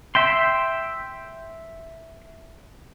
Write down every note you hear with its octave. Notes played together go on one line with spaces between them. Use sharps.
E5 G5 C6